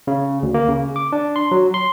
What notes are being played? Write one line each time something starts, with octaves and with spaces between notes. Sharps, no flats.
C#3
D2
A#3
C#3
D6
D4
C6
F#3
C6